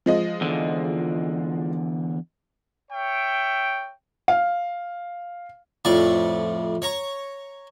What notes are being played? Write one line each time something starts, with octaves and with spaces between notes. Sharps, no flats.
F3 G#3 D#5
E2 D3
C#5 E5 G5
F5
F2 A2 D5 C#6
C#5 A#5 C#6